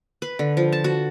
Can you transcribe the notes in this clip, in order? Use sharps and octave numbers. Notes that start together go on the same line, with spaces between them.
B4
D3
F3
A5
F#4